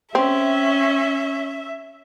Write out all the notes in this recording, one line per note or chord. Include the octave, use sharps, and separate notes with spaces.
C4 C#4 E5